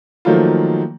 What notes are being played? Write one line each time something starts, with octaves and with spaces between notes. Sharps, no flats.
D#3 F3 F#3 A3 A#3 F4